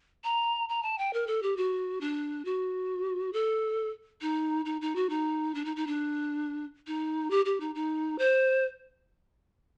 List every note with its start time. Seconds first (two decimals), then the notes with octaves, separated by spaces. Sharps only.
0.24 A#5
0.69 A#5
0.83 A5
0.98 G5
1.13 A#4
1.27 A4
1.43 G4
1.57 F#4
2.01 D4
2.45 F#4
3.33 A4
4.21 D#4
4.65 D#4
4.81 D#4
4.96 F#4
5.10 D#4
5.55 D4
5.65 D#4
5.76 D#4
5.87 D4
6.87 D#4
7.31 G4
7.45 G4
7.60 D#4
7.75 D#4
8.19 C5